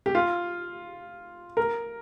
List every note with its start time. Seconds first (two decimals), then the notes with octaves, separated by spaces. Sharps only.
0.06 G4
0.15 F4
1.57 A#4